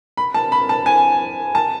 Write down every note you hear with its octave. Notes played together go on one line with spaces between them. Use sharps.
B5
A5
B5
A5
G#5
A5